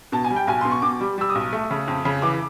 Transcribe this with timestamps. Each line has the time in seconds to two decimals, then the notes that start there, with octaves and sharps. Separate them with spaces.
0.12 B2 A5
0.24 G#5
0.31 G3
0.36 G5
0.47 B1 G#5
0.61 B2 C6
0.71 C#6
0.82 B2 D6
1.01 G3
1.18 G3 E6
1.30 D#6
1.35 B1
1.53 A3
1.71 C#3
1.88 F2
2.05 C#3
2.22 E3 D6